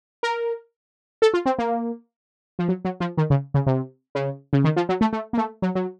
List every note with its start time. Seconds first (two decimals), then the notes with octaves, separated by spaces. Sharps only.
0.23 A#4
1.22 A4
1.34 F4
1.46 C4
1.58 A#3
2.59 F3
2.68 F#3
2.85 F#3
3.00 F3
3.17 D#3
3.30 C#3
3.54 C#3
3.66 C3
4.15 C#3
4.53 C#3
4.64 D#3
4.76 F3
4.89 F#3
5.01 A3
5.13 A3
5.33 A#3
5.37 A3
5.62 F#3
5.75 F#3